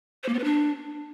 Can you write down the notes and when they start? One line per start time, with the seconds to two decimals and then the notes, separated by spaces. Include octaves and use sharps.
0.23 C5
0.29 A#3
0.34 B3
0.39 B4
0.44 D4